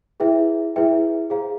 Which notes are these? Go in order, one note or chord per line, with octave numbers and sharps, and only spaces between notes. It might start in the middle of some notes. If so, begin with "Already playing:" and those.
E4 G#4 B4 E5 G5
E4 G#4 B4 E5 G5
G#4 C5 F5 A#5